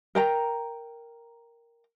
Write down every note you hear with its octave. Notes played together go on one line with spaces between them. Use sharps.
A#4 G5 A#5